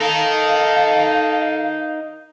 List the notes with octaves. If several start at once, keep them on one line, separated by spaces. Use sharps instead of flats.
D#4 A4 A#4 F5